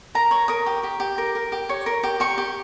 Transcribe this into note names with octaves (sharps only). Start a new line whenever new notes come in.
A#4 A#5
C#5
A#4 D#6
G4
G4
G4
A#4
A#4
G4
C#5
A#4
G4
G4 C#6
G4